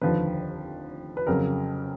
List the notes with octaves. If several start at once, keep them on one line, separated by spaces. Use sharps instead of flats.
F1 D#2 D3 F3 B4
B4
F2 C#3 F#3 A#4